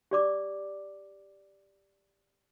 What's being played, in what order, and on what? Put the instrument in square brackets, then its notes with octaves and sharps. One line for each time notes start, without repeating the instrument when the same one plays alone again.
[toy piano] G4 D5 D6